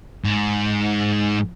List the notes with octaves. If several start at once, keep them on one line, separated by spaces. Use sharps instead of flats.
G#2